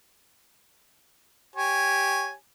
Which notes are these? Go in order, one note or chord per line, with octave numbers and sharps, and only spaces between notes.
G4 C#5 G#5